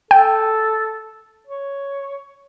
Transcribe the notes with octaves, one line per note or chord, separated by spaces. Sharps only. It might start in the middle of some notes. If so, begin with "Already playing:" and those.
A4 G5
C#5